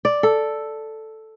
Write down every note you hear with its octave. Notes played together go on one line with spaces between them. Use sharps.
D5
A4